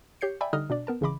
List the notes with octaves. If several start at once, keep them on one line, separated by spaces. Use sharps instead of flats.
G4 C#5 G6 C7 C#7
D5 E5 G5 G#5 B5
D3 G3 D#4 D#5 D#6 F6
B2 D4 D5
B3 A#4 A5
G#1 C#3 E3 D#5 B5 D6